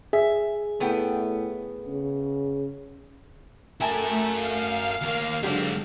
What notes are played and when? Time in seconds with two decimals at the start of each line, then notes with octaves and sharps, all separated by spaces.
0.13 G#4 E5
0.80 A2 A3 B3 G5
1.88 C#3
3.80 A3 F#4 A#4 E5 G#5 A5
4.25 F5
5.01 D#2 A#3
5.43 D3 F#3 G#3 C4 G4